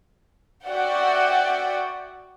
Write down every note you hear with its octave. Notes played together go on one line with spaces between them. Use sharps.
F#4 D5 E5 F#5 G5